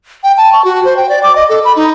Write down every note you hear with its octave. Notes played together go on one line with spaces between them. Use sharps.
G5
A5
C#6
F#4
C5
G5
D5
D6
D#5
A4
B5
D#4